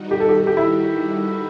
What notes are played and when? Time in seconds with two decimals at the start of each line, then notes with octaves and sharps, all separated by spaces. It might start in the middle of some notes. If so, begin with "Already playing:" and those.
Already playing: D#3 G3 D#4 F#4
0.11 G4
0.20 A4
0.29 G4
0.38 A4
0.47 G4
0.57 E4